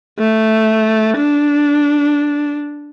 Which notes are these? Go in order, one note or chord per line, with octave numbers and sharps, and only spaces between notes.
A3
D4